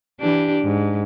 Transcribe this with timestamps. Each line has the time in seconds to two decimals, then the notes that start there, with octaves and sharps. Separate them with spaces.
0.20 E3 D4 G4
0.63 G#2